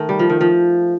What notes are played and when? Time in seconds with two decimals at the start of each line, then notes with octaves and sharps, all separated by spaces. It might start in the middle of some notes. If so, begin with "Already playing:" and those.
Already playing: D#3 A3
0.09 G3
0.19 F3
0.30 D#3
0.41 F3